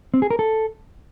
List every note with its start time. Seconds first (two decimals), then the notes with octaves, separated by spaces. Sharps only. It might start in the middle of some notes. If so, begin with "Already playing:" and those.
0.14 C4
0.22 G#4
0.30 A#4
0.39 A4